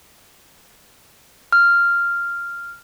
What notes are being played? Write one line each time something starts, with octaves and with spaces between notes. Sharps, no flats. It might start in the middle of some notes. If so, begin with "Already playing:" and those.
F6